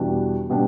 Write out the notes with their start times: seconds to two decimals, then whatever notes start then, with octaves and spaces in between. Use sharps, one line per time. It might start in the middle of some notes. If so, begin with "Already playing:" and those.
Already playing: E2 B2 G3 D4 F#4
0.50 B2 G3 D4